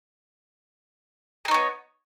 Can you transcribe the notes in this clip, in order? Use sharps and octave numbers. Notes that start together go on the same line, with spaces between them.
B3 D#4 G#4 C#5